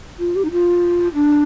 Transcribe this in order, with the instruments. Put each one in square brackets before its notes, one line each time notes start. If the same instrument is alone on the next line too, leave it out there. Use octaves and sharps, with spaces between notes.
[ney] F4
G4
D#4
F4
D4